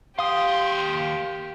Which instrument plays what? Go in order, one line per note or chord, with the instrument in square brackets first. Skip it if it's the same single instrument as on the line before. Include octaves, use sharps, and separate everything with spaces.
[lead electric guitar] D#2 C6 [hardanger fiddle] G4 [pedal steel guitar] F5 D#6